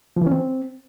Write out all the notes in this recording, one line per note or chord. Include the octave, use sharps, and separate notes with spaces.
F3
E3
C#4
C4